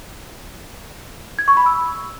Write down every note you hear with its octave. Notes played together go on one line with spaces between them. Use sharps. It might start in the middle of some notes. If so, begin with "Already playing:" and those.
G#6
C#6
B5
E6